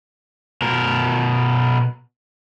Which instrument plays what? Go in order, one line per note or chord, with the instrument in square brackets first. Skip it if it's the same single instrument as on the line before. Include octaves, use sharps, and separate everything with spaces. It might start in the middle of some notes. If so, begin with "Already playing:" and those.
[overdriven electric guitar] B2 A#4